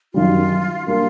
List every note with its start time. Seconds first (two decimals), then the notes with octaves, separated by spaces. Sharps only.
0.14 F#2 D#3 G3 F4
0.86 G3 A#3 D4 F4 G4 A#4